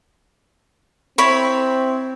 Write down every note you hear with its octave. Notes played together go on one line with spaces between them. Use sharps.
C4 E4 C#5 B5